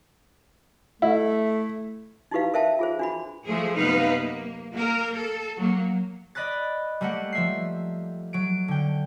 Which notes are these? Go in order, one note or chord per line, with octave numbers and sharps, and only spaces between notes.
A3 E4
D#4 E4 F#4 G4 B4 F5
A#4 C5 E5 F5 G5 A5
F4 G#4 C5
D4 F#4 B5
F3 A3 G#4
F#2 C3 B3 D#4 B4 F5
A#3
A#3 A#4
A4
F#3 A#3
D5 D#5 B5 F#6 A6
G3 A3 A#3 G4 F#5
F3 E5 C7
F#3 D7
D3 G5